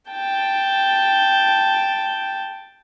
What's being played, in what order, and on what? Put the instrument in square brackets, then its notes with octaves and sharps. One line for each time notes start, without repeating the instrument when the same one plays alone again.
[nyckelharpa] G5 A5